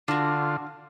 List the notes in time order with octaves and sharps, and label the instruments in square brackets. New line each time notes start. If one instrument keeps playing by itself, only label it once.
[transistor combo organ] D3 F4 [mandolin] D4 F#4